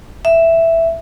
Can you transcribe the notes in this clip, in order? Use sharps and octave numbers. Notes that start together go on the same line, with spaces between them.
E5